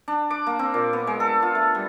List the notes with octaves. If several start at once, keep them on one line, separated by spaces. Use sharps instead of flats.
D4
D6
A#3
C4
A#2
B3
G#3
A4
F4
A3
G3